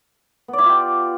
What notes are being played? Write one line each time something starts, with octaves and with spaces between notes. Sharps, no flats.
B3
D5
E4
F4
G4